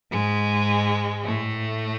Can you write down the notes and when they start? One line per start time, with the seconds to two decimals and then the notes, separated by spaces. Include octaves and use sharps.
0.12 G#2 G#3
1.25 A2 A3